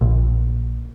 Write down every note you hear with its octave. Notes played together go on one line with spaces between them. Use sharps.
A#1